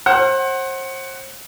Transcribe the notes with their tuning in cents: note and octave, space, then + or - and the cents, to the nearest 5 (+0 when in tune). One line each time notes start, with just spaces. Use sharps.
C5 +35 F#5 +15